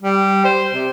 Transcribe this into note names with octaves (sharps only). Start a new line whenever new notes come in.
G3
C5
C3